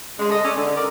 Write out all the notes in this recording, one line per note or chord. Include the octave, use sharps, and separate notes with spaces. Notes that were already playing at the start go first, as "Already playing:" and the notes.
C#3 G#3
A4 D#5
C#4 A4 D5
D3
C#4 A#4 D5